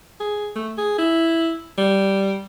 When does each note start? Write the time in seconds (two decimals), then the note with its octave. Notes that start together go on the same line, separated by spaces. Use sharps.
0.20 G#4
0.56 A3
0.78 G#4
0.98 E4
1.78 G3